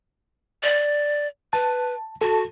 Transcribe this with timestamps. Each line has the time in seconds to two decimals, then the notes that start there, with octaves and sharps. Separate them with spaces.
0.63 D5
1.53 B4 A5
2.21 F#4 A4 A5